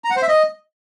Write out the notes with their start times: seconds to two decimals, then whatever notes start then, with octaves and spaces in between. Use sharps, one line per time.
0.04 A#5
0.10 F#5
0.16 C5
0.22 E5
0.28 D#5